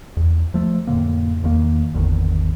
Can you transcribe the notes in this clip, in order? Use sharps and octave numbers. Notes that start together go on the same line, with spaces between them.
E2
F3 A3
F2 A2 D3 A#3
E2 D#3 A#3
G#1 E2 D3 D#3